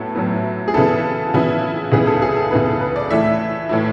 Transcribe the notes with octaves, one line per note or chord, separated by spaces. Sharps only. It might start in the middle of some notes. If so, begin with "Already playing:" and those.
Already playing: A2 F#3 B3 E4 A4
A2 F#3 B3 E4
G#4
C#3 E3 B3 E4 A4
C#3 E3 B3 E4
C#2 C#3 E3 B3 E4 G#4
A4
G#4
A4
C#2 C#3 E3 B3 E4 B4
A4
B4
D5
A2 E3 A3 E4 E5
A2 E3 A3 E4